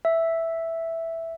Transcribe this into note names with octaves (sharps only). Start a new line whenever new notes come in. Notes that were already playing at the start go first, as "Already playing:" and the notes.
E5